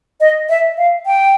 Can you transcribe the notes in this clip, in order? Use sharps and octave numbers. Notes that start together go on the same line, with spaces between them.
D#5
E5
F5
G5